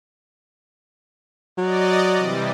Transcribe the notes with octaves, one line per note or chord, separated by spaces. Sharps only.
F#3 D5 D#5
C3 E3 G3